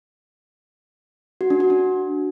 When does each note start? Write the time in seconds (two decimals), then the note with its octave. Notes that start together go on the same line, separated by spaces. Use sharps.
1.41 F#4
1.50 D4
1.60 F#4
1.70 D4